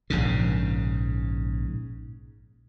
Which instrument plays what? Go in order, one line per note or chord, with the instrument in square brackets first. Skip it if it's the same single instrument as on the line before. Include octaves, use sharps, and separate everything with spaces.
[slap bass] A#1 G#2 C#3